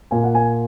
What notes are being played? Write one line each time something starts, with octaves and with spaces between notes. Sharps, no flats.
A#2 G#5
F#5
G#5